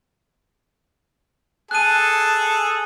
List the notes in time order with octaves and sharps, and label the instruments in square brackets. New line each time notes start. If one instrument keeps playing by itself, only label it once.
[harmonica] G#4 A4 [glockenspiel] F#6 D#7